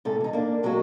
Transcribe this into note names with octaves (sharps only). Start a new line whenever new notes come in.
G#2 C3 A4
E2 D#4
A#3 D4
C3 F#3 G#3 A#3 F#4